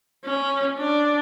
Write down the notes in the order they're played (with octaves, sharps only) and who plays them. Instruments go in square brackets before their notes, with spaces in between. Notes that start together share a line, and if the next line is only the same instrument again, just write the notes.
[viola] C#4
D4